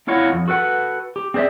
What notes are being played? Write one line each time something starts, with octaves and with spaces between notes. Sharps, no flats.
C4 E4 F4 C#5 D#5 F#5
F2
F#4 A4 B4 F#5
G4
C4 G#4 C5 D5 E5